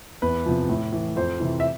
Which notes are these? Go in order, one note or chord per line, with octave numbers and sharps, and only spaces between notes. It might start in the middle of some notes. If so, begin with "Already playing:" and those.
E2 B4
C3 F3
A2
E3
F2 C5
C3 E3
E5